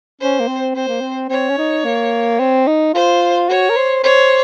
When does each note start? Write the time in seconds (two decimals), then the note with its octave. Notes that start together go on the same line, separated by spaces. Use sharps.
0.21 C#4 C5
0.40 A#3
0.48 C4
0.75 C4 C5
0.88 A#3
1.01 C4
1.30 C4 C#5
1.49 C#4
1.58 D#4
1.85 A#3
2.39 C4
2.67 D#4
2.94 F4 C5
3.48 F#4 C#5
3.70 A#4
3.77 C5
4.03 C5 C#5